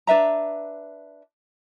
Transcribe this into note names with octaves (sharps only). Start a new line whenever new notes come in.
D4 B4 E5 A#5